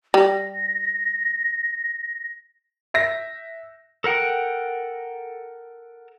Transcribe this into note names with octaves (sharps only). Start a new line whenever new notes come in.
G3 A#6
E5 A#6
A4 A#4 F#5 G5